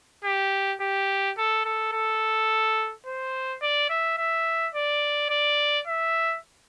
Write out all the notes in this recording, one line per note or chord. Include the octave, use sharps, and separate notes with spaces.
G4
G4
A4
A4
A4
C5
D5
E5
E5
D5
D5
E5